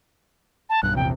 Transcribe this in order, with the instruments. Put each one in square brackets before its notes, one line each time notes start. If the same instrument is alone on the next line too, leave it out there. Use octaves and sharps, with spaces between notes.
[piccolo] A5
[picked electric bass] B1 G2 [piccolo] F#6
[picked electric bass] A#1 E2 C3 [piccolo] G5